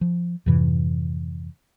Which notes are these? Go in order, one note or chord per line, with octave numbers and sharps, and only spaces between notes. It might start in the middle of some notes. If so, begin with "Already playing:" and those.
F3
F2 G#2 C3 E3